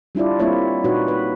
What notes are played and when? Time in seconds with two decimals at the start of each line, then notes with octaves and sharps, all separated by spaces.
0.15 G3 D4 E4 F4 D5
0.40 G3 A#3 C4 E4 F4 C#5
0.84 A#2 D#4 F#4 B4 C#5
1.08 B4